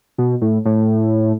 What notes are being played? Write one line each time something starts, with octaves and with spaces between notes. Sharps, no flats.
B2
A2
A2